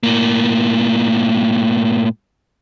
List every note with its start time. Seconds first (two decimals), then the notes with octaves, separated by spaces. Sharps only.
0.03 A2 A#3